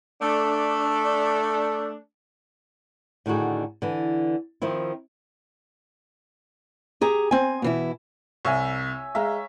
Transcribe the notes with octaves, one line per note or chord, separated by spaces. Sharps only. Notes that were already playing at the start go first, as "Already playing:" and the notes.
A3 D4
A2 D3 D#3 D#4 F#4 G#4
D3 E3
D#3 F3 C4 E4
G4 G#4 A#5
C4 G#5
B2 E3 E4
C2 C#5 E5 G#5
G#3 E5 F5 A#5